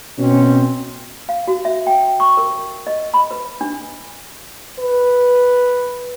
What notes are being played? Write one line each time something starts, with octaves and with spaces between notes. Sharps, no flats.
B2 C4 C#4
F5
F#4
E5
G5
C#6
A#4
D#5
B5
B4
D4
B4